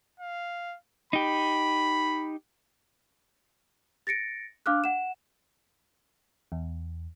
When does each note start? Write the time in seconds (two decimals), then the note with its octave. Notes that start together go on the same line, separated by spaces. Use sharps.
0.20 F5
1.13 D#4 G4 B5
4.07 A6 A#6 C#7 D7
4.66 D4 F5 D6 F6 F#6
4.84 F#5 E7
6.52 E2